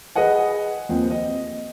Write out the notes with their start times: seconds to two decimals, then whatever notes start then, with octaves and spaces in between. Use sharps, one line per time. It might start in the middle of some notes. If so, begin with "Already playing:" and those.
0.16 G#4 B4 D#5 F#5 G#5
0.89 D#2 F3 C4
1.10 D#5